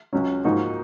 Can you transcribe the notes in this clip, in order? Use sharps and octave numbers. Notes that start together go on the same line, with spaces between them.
C#2 C#3 F#3 C#4
G#2 F3 A#3 D#4 F#4